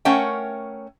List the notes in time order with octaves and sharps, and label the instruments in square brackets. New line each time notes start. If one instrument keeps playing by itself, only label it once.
[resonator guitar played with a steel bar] A3 C#4 A#4 C#5 F#5 G5